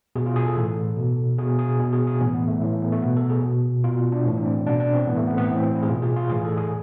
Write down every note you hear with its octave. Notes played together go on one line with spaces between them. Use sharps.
B2 G#4
F4
G#4
A4
A2 E3
B2
B2 G#4
G#4
B2
G#4
G#4
A2 E3 B3
B3
A3
A2 E3
A3
B3
A3
B2 B3
A4
G#4
B2
B2 F4
D4
A2 E3
D4
C4
B2 D4
D4
C4
A2 E3 B3
A3
C4
B3
B3
A2 E3 C4
C4
E4
G#4
B2 F4
G#4
F4
A2 E3 G#4
A4
G#4